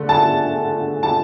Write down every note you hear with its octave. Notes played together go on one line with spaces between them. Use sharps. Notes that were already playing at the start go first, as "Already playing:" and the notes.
Already playing: D3 A3
A5
A5